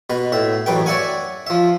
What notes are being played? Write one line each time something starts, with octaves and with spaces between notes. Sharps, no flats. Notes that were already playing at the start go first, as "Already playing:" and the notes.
B2 B4
A2 E5
A1 F#2 B4 G5
C#5 D5 E5 F#5 G#5
F3 E5